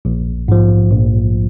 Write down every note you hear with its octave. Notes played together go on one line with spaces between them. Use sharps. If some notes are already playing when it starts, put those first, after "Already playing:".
A#1
G#2 F3
A#1